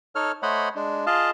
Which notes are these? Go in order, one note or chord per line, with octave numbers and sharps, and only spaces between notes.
D#4 A4 C#5 F6
A3 C5 C#5 D#5 F#5 B5
G#3 D4
F4 G#4 D#5 F5 A5